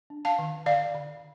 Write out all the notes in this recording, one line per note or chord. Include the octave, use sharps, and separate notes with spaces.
D4
F5 A5
D#3
D3 D5 F5
D3